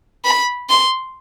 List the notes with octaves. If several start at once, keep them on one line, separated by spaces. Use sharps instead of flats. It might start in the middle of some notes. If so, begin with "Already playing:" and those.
B5
C6